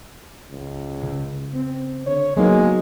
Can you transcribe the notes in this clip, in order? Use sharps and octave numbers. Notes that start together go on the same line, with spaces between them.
C#2
C#3
C4
D3 C#5
F#3 G#3 A#3 B3 D#4